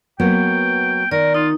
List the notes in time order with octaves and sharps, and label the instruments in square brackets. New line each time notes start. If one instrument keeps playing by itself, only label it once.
[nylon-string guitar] F#3 A#3 B3 [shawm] G5
[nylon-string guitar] D#3 [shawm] A#4 [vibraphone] D5
[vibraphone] D#4 [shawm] F4